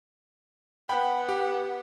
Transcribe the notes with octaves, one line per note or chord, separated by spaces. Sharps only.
B3 F#5 G5 B5
G4